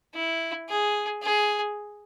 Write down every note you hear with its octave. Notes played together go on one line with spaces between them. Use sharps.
E4
G#4
G#4